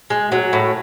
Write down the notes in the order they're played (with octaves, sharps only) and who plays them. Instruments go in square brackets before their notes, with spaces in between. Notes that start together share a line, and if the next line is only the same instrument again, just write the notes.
[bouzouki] G#3
F#3
A2